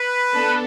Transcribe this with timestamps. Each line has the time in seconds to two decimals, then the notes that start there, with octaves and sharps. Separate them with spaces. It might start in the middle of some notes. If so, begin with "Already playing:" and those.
Already playing: B4
0.34 B3 D4 A4